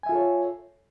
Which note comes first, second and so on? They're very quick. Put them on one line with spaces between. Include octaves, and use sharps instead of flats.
G#5 E5 F4 A4 C#5